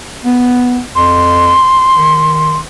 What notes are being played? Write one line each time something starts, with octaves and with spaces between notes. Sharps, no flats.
B3
F2 C6
D#3